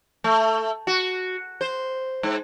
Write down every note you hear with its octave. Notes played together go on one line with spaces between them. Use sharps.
A3
F#4
C5
G#2